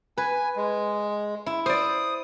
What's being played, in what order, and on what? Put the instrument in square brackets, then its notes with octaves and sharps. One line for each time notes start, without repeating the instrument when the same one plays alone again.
[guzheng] B4 [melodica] G#5
[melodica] G#3
[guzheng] E4
[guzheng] C5 D5 [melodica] D#6